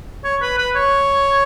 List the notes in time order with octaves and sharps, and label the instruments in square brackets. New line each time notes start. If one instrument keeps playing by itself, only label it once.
[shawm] C#5
B4
B4
C#5